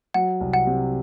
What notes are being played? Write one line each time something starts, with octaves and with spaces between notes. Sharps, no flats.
F#3 F#5
C2
F#5
C3